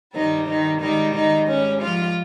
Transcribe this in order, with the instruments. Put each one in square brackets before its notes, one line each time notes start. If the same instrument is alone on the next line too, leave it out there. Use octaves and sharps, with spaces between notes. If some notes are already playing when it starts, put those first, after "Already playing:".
[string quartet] G2 D#3 G3 D#4
D#3 D#4
G#2 D#3 G3 D#4
D#3 D#4
G#2 G3 C#4
F3 F4